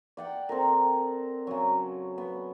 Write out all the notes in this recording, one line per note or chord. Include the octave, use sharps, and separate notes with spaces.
D5 F#5 G5
C4 A4 A#4
C#3 F#3
B3